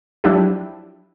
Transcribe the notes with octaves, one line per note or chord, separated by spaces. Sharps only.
F3 F#3 D4 E4 G4